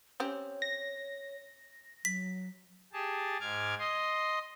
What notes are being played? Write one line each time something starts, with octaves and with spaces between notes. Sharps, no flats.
C4 C#4 G4 C#5
A#6
F#3 B6
G4 G#4 A5
G#2 D6 F6 G#6
D#5 C6